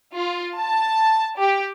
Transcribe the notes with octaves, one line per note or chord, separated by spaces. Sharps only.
F4
A5
G4